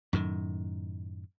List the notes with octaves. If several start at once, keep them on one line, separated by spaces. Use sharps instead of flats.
F#2 A2 D#3